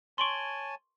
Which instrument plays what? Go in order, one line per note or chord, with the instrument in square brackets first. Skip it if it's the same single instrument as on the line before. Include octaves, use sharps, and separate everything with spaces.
[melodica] C#5 G#5 A5 [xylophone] C6 C#6 [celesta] D7 F#7 G7